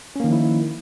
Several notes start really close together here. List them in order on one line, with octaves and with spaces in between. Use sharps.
C#4 A#3 D#3 F3 E4